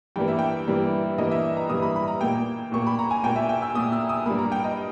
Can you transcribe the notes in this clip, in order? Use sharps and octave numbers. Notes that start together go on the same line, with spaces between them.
G2 E3 G3 A#3 G5
E5
G5
G2 E3 G3 A#3
G2 E3 G3 A#3 D#5
E5
A#5
G2 E3 G3 A#3 D#6
B5
B5
A#5
A#2 A#3 G5
A#2 A#3 C#6
B5
A#5
G#5
A#2 A#3 G5
E5
G5
E6
A#2 A#3 D#6
E6
D#6
G2 G3 A#3 B5
A#5
G5
D#5